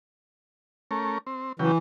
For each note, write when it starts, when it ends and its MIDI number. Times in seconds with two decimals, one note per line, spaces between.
0.91 1.18 57
0.91 1.18 61
0.91 1.18 70
1.27 1.53 60
1.59 1.72 49
1.59 1.78 52
1.59 1.72 54
1.59 1.72 79